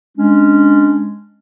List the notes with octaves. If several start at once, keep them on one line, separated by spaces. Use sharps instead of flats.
G#3 C#4 D4